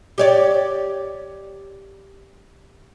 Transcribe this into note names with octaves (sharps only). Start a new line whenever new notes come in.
G4 C#5 D5